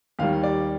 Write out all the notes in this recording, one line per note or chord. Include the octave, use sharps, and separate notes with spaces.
D#2 D#3 G3 F5
D5